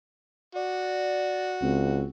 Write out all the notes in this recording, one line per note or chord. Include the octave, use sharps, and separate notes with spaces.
F#4 D5
C#2 C4